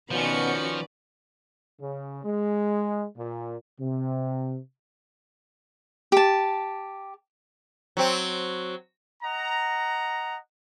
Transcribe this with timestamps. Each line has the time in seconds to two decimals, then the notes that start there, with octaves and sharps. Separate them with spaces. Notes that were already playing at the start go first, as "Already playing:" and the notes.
0.11 B2 D#3 F3 C#4 F#4 B4 D5 C#7
1.81 C#3
2.23 G#3
3.17 A#2
3.80 C3
6.12 G4 A5
7.97 F#3 C4
9.23 D#5 F#5 A#5